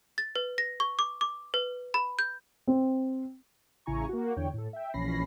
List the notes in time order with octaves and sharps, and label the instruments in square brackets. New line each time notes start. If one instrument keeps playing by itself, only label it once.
[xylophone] A6
B4
A#6
C#6
D6
D6
B4
B5
G6
[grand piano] C4
[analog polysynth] A1 C#3 E4 G#5 A#5 C#6
A#3 F#4
E2 D3 C#5 G5
A2 A4
E5 G5
A#1 E3 C#4 B5 A#6 C7